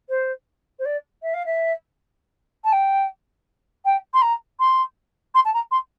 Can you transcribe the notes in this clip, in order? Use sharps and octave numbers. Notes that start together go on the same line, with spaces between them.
C5
C5
D5
E5
F5
E5
A5
G5
G5
C6
A#5
C6
C6
A5
A#5
C6